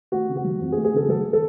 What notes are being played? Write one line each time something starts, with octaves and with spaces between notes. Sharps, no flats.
A3 F#4
C#3
F#4
F#3
F2
G#4
A3
G#4
C#3 A4
F#3 A4
A4